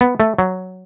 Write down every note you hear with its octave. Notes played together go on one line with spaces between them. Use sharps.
B3
A3
F#3